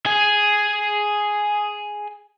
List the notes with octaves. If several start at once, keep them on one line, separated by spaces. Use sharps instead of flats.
G#4 G#5